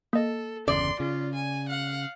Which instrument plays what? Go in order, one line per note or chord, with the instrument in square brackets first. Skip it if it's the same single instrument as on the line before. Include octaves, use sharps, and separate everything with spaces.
[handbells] A#3 D#5 [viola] A4
[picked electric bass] G1 E2 C#3 [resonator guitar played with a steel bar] D5 [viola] C6
[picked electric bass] C#3 [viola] F4
[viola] G#5
F5 F#5